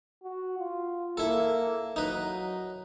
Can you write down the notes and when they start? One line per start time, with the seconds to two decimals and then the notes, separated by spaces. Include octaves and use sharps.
0.23 F#4
0.59 F4
1.17 A#3 E4 A4
1.96 F#3 D#4 B4